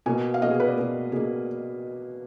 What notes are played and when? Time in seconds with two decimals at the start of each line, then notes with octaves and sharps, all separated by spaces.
0.06 B2 A#3 G#5
0.34 F5
0.42 B2 A#3 D#5
0.50 G#4
0.60 B4
0.68 D5
0.77 B2 A#3
1.12 B2 A#3 G#4